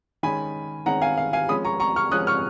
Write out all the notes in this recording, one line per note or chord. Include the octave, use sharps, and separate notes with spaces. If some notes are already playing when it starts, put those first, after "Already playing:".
D#3 G#3 C#4 G#5 B5
D#3 G#3 C#4 F#5 A#5
F5 G#5
F5
F5 G#5
F3 G#3 C#4 B5 D#6
A#5 C#6
A#5 C#6
C#6 F6
F3 G#3 C#4 D#6 F#6
C#6 F6